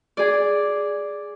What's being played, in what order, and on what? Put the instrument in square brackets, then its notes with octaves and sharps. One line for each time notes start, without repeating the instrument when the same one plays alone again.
[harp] G#4 D5